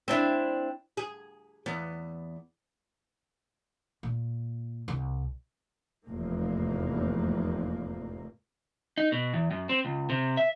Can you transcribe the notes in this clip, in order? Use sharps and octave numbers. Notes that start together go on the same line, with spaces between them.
C4 D4 E4
G#4
E2 B3
A#2
C2
F1 E2 G#2 A#3
D#4
B2
E2
F#2
C4
C#2
C3
E5